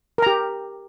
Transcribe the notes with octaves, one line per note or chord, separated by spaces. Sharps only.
G4 A#4 A#5